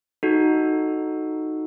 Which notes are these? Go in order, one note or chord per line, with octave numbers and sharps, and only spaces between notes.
D#4 F#4 A4